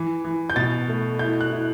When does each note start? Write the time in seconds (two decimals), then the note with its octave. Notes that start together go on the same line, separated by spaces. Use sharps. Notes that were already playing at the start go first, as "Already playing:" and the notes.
Already playing: E3
0.25 E3
0.50 G6
0.56 B2 A6
0.88 A3
1.19 E4 G6
1.41 F#6
1.52 E4